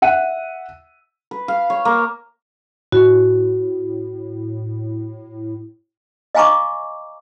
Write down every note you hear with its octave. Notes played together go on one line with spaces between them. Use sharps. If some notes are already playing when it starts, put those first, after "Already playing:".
E5 F#5 D#7
B4
F5
C#5
A#3
A2 F#4
D#5 F5 G#5 A#5 C#6 D6